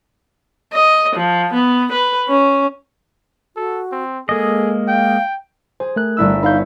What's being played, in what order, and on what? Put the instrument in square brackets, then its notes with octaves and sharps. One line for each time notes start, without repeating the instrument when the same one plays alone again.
[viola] D#5
F3
B3
B4
C#4
[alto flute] F#4 [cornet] A4
[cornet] C4
[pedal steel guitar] G#3 A#3 D#5 [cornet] G#4 [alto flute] A4
[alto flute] F5 [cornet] G5
[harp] G#4 [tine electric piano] C5
[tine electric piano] A3 A#4 F#6
[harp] G1 E4 E6
[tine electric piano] D#4 F5 G6 [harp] B4 C#5